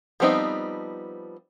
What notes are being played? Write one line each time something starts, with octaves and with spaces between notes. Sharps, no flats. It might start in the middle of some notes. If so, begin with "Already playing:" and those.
F3 G3 B3 C4 D#4